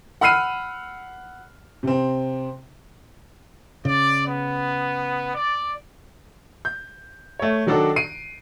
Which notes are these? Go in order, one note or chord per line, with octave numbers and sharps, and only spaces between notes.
F#5 B5 E6 F6 C7 D#7
C3 C4
C#3 D5
B3
D5
G6
A3 C#5
D#3 F#3 D4 F#4 A4 D5
C7 D7 D#7